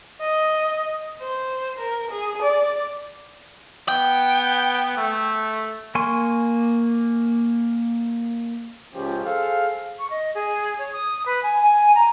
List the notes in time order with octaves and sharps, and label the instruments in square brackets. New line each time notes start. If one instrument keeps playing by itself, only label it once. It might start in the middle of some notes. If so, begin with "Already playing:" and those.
[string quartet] D#5
C5
A#4
G#4
D5
[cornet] B3 [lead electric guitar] G5
[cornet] A3
[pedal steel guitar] A#3 G#5 C6 C#6
[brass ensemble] C#2 F3 C#4 G4
G#4 A4 C5 F5
[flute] C#6
D#5
G#4
C#5
D#6
B4
G#5
G#5
A#5